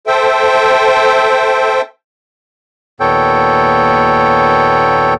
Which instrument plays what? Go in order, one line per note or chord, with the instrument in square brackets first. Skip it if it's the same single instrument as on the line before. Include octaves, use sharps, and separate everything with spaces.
[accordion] A4 C5 E5 G5
[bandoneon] D#2 A#2 B3 A4 C#5 G5